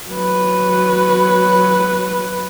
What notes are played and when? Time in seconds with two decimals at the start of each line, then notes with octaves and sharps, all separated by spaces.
0.10 F#3 B4